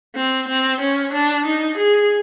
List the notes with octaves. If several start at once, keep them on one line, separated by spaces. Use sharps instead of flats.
C4
C4
C#4
D4
D#4
G#4